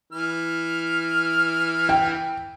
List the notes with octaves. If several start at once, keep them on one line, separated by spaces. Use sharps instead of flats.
E3 F6
G5